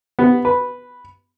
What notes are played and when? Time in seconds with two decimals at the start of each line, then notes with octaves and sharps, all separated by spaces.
0.19 B3
0.45 B4